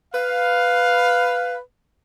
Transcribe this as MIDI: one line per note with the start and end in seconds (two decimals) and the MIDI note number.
0.14 1.58 71
0.14 1.58 77